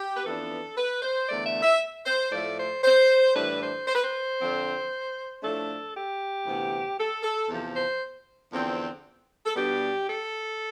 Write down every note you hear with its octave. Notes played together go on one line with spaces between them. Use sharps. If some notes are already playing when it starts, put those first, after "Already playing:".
Already playing: G4
B4
F2 E3 B3 D4 A4
B4
C5
E2 D3 A3 D5
E5
E5
C5
A2 F3 A3 D5
C5
C5
A2 E3 G3 D4 B4
C5
C5
B4
C5
F2 D3 F3 C4
A2 F3 A3 D4 A4
G4
D2 C3 E3 B3
A4
A4
E2 C3 F3
C5
E2 D3 F3 C4
A4
B2 G3 B3 D4 G4
A4